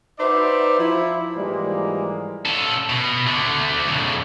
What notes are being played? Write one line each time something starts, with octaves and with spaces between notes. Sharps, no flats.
D#4 F#4 B4 C5 D5 E5
F3 E4
G#2 E3 F3 G3 G#3 A#3
C#4 A4
B2
D3 A3
F2 C#3